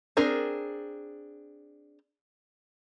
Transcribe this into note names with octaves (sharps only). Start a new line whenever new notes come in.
C4 D4 G#4 A#4